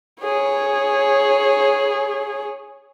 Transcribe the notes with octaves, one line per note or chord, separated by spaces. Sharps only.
G#4 C#5